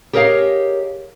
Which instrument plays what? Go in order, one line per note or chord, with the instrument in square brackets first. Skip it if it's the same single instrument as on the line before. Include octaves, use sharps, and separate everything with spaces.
[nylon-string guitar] G4 G#4 A#4 C#5 D#5 F5